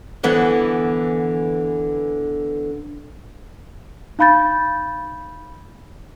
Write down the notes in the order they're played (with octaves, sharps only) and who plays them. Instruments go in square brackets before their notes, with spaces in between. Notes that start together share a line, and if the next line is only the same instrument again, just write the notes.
[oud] D3 E3 B3
[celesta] D#4 F5 B5 G6 A6